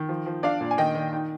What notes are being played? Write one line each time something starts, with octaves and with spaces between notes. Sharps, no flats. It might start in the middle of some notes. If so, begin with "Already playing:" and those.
Already playing: D#3
F3
F3
D4 D5 F5
A#2
G#5
D#3 D#5 G5
D#3
D#4